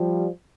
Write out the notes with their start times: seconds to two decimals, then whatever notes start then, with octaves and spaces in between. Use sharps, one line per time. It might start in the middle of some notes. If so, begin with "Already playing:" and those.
Already playing: F3 G3